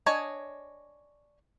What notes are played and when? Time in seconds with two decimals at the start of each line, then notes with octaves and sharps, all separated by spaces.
0.06 D4 C#5 D#5 G#5